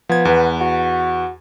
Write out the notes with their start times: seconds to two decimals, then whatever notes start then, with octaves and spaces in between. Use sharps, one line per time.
0.09 F3 B3 G#6
0.25 E2 B4
0.61 F#4